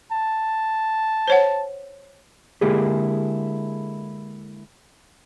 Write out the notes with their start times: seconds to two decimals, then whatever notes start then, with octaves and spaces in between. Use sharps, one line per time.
0.12 A5
1.28 C5 C#5 F#5
2.61 D3 G#3 A#3 E4 G4 G#4